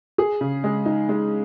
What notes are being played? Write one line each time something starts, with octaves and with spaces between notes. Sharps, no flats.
G#4
C#3
G#3
D#4
G#3